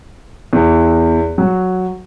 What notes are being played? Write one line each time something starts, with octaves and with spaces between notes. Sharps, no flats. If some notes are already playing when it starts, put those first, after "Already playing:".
E2
F#3